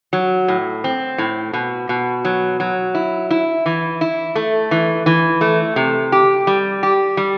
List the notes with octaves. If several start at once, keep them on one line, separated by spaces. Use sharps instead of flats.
F#3
A2
C4
A2
B2
B2
F#3
F#3
E4
E4
E3
E4
A3
E3
E3
A3
C3
G4
G3
G4
G3